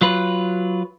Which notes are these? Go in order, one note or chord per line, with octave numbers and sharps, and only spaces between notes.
F#3 F4 B4